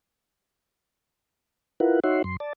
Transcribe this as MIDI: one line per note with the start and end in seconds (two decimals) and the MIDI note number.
1.80 2.00 64
1.80 2.00 65
1.80 2.00 70
1.80 2.00 71
1.80 2.00 78
2.04 2.22 63
2.04 2.22 66
2.04 2.22 73
2.04 2.22 76
2.04 2.22 78
2.04 2.22 84
2.24 2.37 42
2.24 2.37 84
2.40 2.53 74
2.40 2.53 81